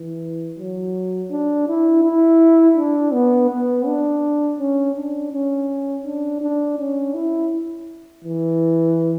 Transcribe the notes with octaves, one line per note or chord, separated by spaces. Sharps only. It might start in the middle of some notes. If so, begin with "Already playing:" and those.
Already playing: E3
F#3
D4
E4
E4
D4
B3
B3
D4
C#4
D4
C#4
D4
D4
C#4
E4
E3